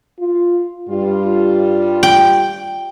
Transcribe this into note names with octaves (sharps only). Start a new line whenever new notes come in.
F4
G2 G3 F4
G5